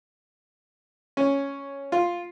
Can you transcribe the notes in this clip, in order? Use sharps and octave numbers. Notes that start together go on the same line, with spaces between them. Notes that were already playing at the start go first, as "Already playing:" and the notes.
C#4
F4